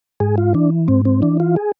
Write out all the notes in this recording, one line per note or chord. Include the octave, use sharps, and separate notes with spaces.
G#2 G#4
F4
E3 D4
G#2 C4
C4
E3 D4
F4
G#4